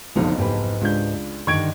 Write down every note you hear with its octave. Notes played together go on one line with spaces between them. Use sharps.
F#1 B1 F2 D3 F3 D#4
G#2 G4 B4
C#2 D4 G6
G2 D3 D#3 C#6 G#6 D7